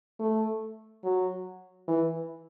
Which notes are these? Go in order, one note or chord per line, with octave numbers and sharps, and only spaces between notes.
A3
F#3
E3